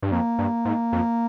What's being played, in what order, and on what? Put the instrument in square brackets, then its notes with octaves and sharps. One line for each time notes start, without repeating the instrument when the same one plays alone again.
[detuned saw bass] G2
[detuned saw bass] F2 [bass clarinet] A#3
[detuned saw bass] G2
G#2
F2